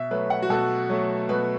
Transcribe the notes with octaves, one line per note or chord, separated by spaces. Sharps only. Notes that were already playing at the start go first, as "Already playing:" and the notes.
Already playing: B2 E5
F#3 A3 B4
F#5
F#4
B2 A4
F#3 A3
B2 B4